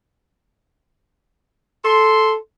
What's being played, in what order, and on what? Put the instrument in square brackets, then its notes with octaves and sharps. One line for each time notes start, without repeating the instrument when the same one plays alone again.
[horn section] A4 C6